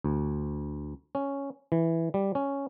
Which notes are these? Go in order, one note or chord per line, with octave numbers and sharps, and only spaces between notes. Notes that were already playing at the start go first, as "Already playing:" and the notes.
D2
C#4
E3
G3
C#4